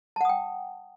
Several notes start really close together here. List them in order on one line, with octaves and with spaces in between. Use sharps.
A5 F#5 D#6 G5